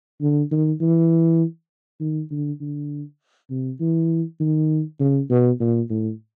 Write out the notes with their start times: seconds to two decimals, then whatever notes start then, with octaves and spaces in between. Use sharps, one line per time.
0.21 D3
0.51 D#3
0.81 E3
2.00 D#3
2.31 D3
2.60 D3
3.50 C3
3.80 E3
4.40 D#3
5.00 C#3
5.30 B2
5.60 A#2
5.90 A2